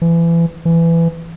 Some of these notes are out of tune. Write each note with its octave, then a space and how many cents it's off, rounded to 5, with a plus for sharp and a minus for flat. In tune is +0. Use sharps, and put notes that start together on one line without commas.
E3 +30
E3 +20